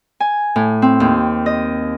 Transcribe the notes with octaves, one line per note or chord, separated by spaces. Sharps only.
G#5
A2
C4
D#2
D#5